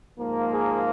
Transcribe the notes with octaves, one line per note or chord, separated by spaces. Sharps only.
G#2 F3 A#3
G#4